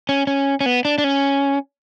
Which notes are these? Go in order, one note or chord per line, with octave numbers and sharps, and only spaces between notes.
C#4
C#4
C#4
B3
D4
D4
C#4